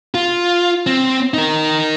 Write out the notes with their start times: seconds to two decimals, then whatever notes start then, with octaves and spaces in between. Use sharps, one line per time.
0.14 F4
0.87 C4
1.34 D#4 A#4